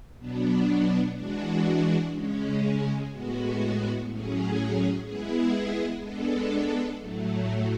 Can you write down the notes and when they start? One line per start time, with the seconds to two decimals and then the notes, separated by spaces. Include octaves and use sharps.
0.19 B2 F#3 B3 D4
1.16 E3 G#3 D4 F#4
2.13 C#3 G#3 C#4
3.11 A2 G#3 B3 F#4
4.07 A2 F#3 C#4 G#4
5.04 G#3 B3 E4 G#4
6.02 G#3 B3 D4 A4
6.99 A2 F#3 A3